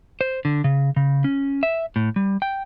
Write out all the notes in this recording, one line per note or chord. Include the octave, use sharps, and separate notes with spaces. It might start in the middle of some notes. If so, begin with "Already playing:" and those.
C5
D3
C#3
C#3
C#4
E5
A2
G3
G5